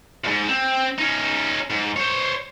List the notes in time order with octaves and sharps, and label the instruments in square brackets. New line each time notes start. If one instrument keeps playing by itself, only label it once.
[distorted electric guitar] E2 G#2
C4
C#4 D#4
G#2
C5 C#5